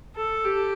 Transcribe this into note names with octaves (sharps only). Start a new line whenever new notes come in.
A4
G4